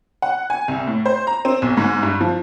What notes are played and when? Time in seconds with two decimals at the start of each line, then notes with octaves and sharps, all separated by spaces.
0.22 F#5
0.50 G#5
0.68 C2
0.87 A2
1.06 C5
1.27 A#5
1.45 C4
1.62 B1
1.77 G#2
2.03 G2
2.21 F3